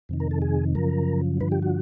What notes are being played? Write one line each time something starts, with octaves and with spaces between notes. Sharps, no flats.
F2 C3 D#3
A#4
A4
G#4
F#2 C#3 F3 A#4
G2 D3 F3 B4
G4
F#4